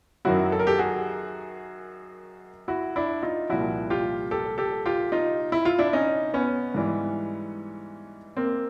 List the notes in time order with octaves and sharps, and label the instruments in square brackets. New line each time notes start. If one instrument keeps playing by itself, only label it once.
[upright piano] F#2 D#3 F#3 E4 F#4
A4
A#4
G4 A4
F#4 G#4
E4 F#4
D4 E4
D#4 F4
C2 A#2 F3 E4 F#4
F4 G4
G4 A4
G4 A4
F4 G4
D#4 F4
E4
F4
D4 E4
C#4 D#4
B3 C#4
G#2 E3 G3
A#3 C4